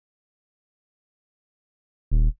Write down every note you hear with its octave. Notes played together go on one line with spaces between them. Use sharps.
D#1